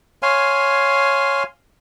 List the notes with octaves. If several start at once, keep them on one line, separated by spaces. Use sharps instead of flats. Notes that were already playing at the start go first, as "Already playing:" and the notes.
C#5 F5 G#5 C6